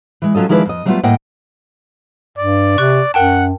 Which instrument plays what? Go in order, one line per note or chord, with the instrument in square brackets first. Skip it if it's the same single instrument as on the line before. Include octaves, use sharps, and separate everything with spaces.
[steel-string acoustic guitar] E3 G#3
F#3 C#4 F4 A4 D#5
D#3 F3 G#3 E4 B4 D5
F2 D#5
F#3 G3 A3 B3 C#4 F4
A2 A#3 D#5 F#5 G5
[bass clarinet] G2 [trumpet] D5
[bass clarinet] C3 [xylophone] C#6 F#6
[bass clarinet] F#2 [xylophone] A#4 G5 A5 [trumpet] F#5